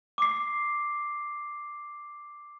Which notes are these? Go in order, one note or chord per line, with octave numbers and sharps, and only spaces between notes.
D6 C7